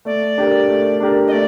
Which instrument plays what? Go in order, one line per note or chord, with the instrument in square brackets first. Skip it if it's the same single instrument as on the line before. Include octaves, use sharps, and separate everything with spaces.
[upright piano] A3 [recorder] D5
[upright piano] D4 G4 A#4
A3
D4 G4 A#4
[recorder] D#5
[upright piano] A3 [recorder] D5